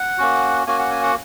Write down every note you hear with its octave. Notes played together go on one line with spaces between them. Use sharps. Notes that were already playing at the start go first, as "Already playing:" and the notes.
Already playing: F#5
A#3 C#4 F#4
A#3 C#4 F#4 G#5
F#5
G#5
F#5